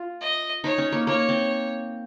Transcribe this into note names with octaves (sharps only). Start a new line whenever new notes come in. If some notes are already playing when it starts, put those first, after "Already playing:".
Already playing: F4
D#5
D#4 C#5
C#4
A#3
A#3 C#5
C4